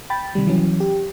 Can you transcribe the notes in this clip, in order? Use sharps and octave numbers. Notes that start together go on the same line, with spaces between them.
G5 B5 A6
C3 D#3 G3
E3 F#3 C#4
G4